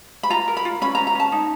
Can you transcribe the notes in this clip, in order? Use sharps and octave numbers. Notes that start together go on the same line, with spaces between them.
B5
F4 A#5
A#4
B5
F4
C#4 B5
A#5
C#4
A#5
C#4 A5
D#4